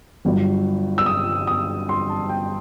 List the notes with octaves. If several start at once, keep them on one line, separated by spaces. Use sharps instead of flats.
G1 G2 F#3
E6
D#6
D#6
C6
A5
G5